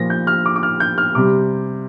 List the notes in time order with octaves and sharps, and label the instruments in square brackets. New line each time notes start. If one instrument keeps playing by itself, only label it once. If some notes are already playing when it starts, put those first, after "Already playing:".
Already playing: [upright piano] A#2 F3 A#6
G6
F6
D6
D6
F6
G6
F6
C3 G3 D6